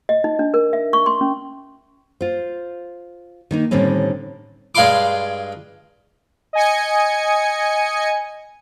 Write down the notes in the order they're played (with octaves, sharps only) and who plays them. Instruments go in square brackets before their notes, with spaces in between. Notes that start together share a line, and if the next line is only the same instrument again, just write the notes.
[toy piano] D#5
D#4
D4
A#4
E5
C#6
C6
C#4
[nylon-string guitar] F4 C5
D#3 A#3 D#4
A2 D3 D#3 G3 C4 C#4
[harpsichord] G2 G#3 F5 B5 C6 D6
[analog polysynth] D#5 G#5 C#7